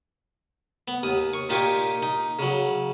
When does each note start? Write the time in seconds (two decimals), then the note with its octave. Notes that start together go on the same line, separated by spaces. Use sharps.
0.88 B3
1.03 D#2 D#6
1.34 C#6
1.49 A#2 D#4 F4 G4 G#5 C#6
2.03 D#4
2.39 C#3 F#3